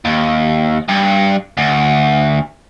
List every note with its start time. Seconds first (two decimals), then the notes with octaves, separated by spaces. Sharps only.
0.05 D#2
0.88 G2
1.57 D2